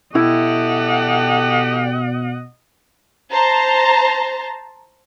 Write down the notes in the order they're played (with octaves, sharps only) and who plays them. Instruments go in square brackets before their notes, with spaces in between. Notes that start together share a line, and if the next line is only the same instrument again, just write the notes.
[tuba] B2 [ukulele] E4 [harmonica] G4 A4 G5 [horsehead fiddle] D#5 F#5
[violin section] C5 A5 A#5